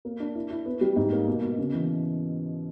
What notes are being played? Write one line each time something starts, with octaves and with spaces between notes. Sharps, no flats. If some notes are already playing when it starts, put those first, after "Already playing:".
A#3
D4
E4
E4
B3
G3
G#2
A#3
B2
B2
C#3
E3